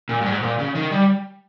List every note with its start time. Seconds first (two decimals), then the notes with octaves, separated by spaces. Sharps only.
0.09 A#2
0.21 G2
0.26 G#2
0.42 A#2
0.59 C#3
0.75 D#3
0.91 G3